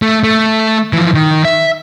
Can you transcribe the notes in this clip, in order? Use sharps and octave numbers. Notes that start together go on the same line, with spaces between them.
A3
A3
E3 F3
D#3
E5